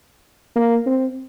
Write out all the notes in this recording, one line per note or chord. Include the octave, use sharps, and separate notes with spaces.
A#3
C4